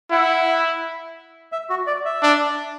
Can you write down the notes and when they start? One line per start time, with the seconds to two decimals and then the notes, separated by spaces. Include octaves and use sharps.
0.11 E4 F#5
1.52 E5
1.70 F#4
1.87 D5
2.05 E5
2.23 D4